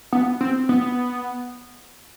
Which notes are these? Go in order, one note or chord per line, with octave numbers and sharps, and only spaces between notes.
B3
C4
B3